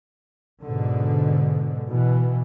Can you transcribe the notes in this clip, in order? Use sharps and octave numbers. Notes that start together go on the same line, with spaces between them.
G#2 B2 D3
B2 E3